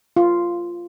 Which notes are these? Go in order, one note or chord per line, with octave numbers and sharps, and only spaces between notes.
F4